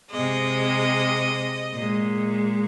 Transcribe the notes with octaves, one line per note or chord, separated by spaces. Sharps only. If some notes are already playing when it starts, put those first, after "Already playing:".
C3 G#3 D#5
A#2 G#3